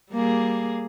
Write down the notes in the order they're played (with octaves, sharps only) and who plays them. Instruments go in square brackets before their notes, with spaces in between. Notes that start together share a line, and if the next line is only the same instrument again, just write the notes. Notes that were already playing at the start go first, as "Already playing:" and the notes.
[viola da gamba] G3 A#3 G#4